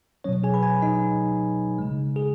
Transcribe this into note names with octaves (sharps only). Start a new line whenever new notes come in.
B2 F#3 C#4 C#5
G#4 G#5
B4 B5
G#4 G#5
D#4 D#5
C#3 G#3
G#4